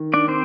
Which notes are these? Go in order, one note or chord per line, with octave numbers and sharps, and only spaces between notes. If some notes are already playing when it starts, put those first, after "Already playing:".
Already playing: D#3
D4 D5
C4 C5